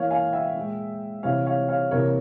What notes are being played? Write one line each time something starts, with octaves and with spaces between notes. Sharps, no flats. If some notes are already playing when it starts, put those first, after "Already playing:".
Already playing: E3 A#3 C#5 F5
F5 G#5
E5 G5
A#2 G#3
C3 E3 G3 C#5 F5
C#5 F5
C#5 F5
C3 E3 G3 A#3 A#4 C#5